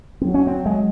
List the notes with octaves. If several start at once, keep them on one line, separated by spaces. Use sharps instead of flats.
F#3 C4
C#4
C4
G#3